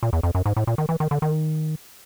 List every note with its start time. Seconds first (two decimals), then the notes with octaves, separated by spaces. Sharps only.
0.03 A#2
0.13 E2
0.23 F2
0.35 F#2
0.46 G#2
0.57 A2
0.67 A#2
0.78 D#3
0.89 E3
1.00 D#3
1.11 D3
1.22 D#3